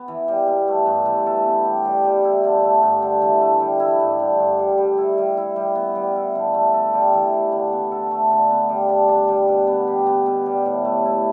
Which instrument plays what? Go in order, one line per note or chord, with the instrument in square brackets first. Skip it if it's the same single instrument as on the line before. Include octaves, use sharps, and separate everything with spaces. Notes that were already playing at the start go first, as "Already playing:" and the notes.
Already playing: [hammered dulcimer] B3
E3
G3
B2
A3
G2
E3
A4
B3
G4
G3
G3
E4
D3
A3
G2
D3
E3
A3
G3
E4
G2
D3
G2
G3
G3
E4
G3
E4
G3
B3
G3
E4
D3
A3
A4
G3
E3
G3
D3
B3
A4
A3
D3
B3
G3
D4
D4
G3
B2
B3
G4
B3
B2
G3
A2
A3
E4